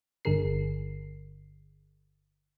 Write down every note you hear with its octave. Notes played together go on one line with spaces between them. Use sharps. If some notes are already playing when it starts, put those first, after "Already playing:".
G1 G2 D3 G#4 A#4 C7